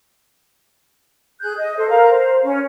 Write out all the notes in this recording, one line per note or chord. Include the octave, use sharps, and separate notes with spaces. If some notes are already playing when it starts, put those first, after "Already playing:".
G#4 F#6 G6
D#5
A4 C5
A#4 F5 A#5
C5
C#4